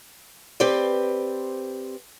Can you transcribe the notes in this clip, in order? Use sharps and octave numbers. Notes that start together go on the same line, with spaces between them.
C4 G4 B4 C5 D5